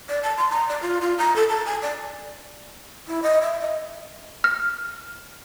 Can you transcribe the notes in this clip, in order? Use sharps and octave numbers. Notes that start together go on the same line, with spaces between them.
D5
A5
C6
A#5
D5
F4
F4
A#5
A4
A5
G#5
D5
E4
D#5
E5
D#5
F6